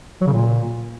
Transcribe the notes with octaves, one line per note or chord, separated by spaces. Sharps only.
F#3
C#3
A#2